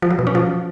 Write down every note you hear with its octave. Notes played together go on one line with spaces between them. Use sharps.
F3
F#3
B2
C#4
F3